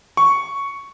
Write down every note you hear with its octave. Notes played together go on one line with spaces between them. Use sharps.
C#6